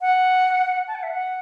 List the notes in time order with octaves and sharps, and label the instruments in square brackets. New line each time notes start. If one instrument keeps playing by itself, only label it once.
[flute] F#5
A5
F#5
E5
F#5